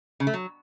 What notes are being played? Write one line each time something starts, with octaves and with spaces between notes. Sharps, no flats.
C#3
A3
F#3